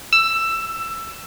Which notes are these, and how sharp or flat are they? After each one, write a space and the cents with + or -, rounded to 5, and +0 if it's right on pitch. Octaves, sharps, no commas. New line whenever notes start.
E6 +15